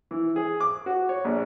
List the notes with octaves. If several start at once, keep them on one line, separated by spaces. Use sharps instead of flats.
E3
G#4
D6
F#4
C#5
A#1